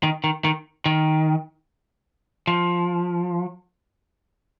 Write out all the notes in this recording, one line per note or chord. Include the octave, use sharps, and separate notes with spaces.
D#3
D#3
D#3
D#3
F3